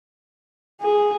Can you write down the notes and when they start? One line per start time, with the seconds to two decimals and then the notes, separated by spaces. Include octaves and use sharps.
0.82 G#4